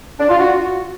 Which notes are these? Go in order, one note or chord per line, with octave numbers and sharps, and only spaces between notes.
D4
F4
F#4